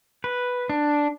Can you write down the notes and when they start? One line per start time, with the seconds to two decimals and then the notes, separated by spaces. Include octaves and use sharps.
0.24 B4
0.70 D4